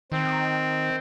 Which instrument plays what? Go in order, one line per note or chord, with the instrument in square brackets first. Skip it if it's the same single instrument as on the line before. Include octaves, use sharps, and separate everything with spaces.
[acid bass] D#3 [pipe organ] C4